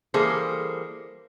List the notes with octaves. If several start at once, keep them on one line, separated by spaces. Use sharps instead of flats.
E3 G3 A#3 G#4 A4 C5